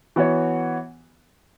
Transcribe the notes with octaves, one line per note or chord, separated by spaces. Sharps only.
E3 B3 F#4 C#5